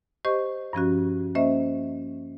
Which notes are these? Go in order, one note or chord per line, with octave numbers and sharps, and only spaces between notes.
G4 C5 D#5 C#6
G2 F3 C#4 F#4
A#3 C#4 C5 D#5 E5